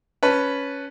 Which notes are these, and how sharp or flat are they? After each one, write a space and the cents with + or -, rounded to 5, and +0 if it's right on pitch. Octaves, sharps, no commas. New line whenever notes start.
C#4 +5 B4 +0 A5 +0